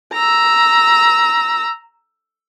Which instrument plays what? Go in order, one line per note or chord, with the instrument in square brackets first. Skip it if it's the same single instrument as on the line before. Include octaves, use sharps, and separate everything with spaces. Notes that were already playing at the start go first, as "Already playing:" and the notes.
[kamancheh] A#5 E6